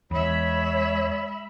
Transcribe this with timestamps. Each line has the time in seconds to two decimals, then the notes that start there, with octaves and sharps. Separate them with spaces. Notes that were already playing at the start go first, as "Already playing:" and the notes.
0.11 E2 G#3 C#5 E5 B5